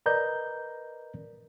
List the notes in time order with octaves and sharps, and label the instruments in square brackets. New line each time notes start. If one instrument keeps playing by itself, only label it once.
[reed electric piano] A#4 B4 D5 D#5 A#5 G6